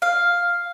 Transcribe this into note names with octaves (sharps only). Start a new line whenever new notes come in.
F5